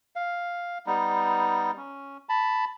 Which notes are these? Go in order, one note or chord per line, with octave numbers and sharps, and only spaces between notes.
F5
G3 B3 D#4
C#4
A5 B5